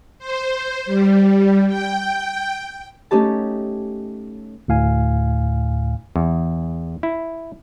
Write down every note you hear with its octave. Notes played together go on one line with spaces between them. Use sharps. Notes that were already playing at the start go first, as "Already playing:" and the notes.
C5
G3
G5
A3 C#4 D#4 G4 A5
D2 A2 F5 G#5
E2
E4